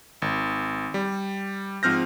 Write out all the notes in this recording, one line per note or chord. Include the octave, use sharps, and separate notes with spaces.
G#1
G3
G#2 F3 C4 F6 G6 A#6